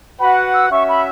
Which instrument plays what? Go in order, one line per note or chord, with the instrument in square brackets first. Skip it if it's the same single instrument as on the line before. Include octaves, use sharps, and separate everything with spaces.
[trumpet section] F#4 B4 F#5 [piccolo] B5
[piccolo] E6
[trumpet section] C#4 F#4 E5 [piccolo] C#6
[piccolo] B5